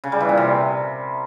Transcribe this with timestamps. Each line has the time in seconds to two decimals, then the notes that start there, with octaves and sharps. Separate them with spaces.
0.04 C#3
0.12 G3
0.21 E3
0.29 A#2
0.37 C3